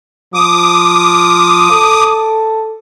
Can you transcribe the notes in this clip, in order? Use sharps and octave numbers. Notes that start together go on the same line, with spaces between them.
F3 D6 D#6
A4